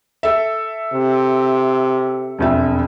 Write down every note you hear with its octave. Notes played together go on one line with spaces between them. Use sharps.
A4 E5
C3
E1 F2 E5